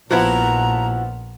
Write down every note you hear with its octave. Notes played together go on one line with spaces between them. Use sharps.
A#1 A#2 F3 B3 E4 F#4 A#5